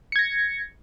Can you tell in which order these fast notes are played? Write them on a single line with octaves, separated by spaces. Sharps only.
C#7 G#6 A#6